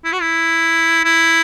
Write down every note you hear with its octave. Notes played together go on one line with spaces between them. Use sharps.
E4
F#4
E4
E4